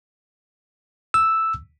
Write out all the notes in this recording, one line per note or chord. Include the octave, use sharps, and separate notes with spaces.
E6